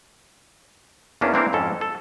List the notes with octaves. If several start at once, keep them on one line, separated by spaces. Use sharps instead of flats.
E2 A#3 C#4 D4
E3 A#3 C4 D4 A#4
F2 G#2 C#4 A4
A4